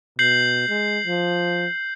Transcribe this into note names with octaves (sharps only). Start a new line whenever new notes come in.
B2 G6 C7 F#7
G#3
F3